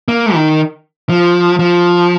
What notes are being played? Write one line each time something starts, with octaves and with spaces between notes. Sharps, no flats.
A#3
D#3
F3
F3